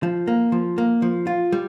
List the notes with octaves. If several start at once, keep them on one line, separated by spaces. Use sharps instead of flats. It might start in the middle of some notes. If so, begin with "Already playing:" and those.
F3
A#3
F3
A#3
F3
F4
G3